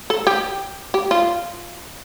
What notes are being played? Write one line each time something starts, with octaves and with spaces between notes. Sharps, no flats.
A4
G4
G4
F4